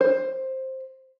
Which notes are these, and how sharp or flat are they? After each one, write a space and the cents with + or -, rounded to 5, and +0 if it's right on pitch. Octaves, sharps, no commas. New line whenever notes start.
C5 +10